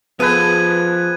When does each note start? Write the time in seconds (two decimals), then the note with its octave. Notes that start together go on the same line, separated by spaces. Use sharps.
0.20 F3 B3 G#4 A4 B4 G#6 D#7